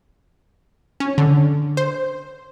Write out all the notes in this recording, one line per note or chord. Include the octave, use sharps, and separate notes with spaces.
C#4
D3
C5